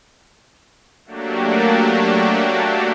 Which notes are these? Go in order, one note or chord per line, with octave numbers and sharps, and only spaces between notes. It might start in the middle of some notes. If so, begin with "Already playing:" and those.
F#3 A3 A#3 D4 F#4 G4